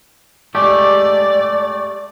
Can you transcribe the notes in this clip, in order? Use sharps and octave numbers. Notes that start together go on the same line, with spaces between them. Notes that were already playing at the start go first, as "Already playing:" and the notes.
G#3 A3 G4 D5